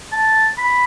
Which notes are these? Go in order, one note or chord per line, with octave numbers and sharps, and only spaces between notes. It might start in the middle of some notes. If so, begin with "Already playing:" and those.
A5
B5